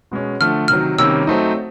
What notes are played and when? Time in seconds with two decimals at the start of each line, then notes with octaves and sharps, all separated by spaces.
0.11 B2 G#3 C#4
0.40 D3 F3 A3 F6
0.68 C3 D#3 F#3 F6
0.98 C3 D#3 G3 A#3 C#4 E6
1.27 F#3 A3 C4 D#4